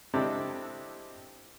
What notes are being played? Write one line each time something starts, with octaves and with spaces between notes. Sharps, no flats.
G#3 C4 D4 E4 G4 A4